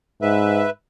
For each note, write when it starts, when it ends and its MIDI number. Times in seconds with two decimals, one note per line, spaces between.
0.22 0.65 44
0.22 0.70 71
0.22 0.70 76